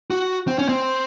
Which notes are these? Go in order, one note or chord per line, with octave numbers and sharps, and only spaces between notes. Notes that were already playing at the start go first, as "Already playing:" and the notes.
F#4
C4
C#4
C4